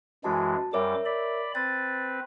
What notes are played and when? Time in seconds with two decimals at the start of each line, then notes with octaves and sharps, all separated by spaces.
0.24 F#2 E3 G#3 F#4 A5
0.73 F#2 G3 A#4 C#5 E5 D6
1.05 D5 B5
1.55 C4 B4 A6